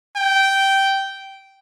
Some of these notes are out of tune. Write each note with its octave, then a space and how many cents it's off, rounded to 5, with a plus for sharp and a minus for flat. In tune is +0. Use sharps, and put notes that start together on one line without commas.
G5 -10